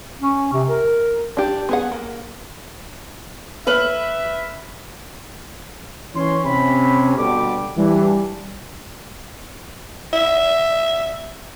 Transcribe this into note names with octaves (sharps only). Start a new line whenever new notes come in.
C#4
C3
A#4
D4 G4
B3 G#4 F#5
A#3
B4 E5 F6 F#7
E3 C#4 C#5 C6
C3 C#4 B5
B2 D3 G3 D6
E3 G3 D4
E5